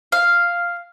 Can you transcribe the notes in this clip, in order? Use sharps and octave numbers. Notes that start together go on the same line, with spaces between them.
F5